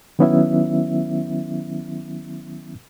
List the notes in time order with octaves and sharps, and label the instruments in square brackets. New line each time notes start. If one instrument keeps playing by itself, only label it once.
[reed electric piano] D#3 F#3 B3 C#4 E4 E5